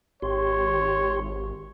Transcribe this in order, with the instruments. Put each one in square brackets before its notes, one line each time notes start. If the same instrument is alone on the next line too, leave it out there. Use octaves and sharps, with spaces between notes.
[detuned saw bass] G#1 [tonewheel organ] G4 C6 [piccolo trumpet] C#5